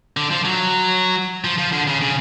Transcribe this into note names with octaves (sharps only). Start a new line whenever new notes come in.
D3
F3
F#3
F3
F3
D3
C#3
C#3